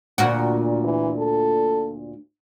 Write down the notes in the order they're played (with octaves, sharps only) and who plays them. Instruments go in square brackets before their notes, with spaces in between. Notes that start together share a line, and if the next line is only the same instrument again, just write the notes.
[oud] D2 A#2 F#4
[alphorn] E3
A4